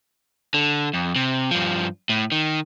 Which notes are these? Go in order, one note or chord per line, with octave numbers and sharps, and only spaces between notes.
D3
F2
C3
G2 F3
A2
D#3